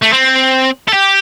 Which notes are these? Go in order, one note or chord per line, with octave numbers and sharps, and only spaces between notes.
A3
C4
A4
G4